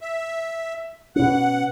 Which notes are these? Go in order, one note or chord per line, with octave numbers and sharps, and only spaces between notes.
E5
B2 C#4 F#5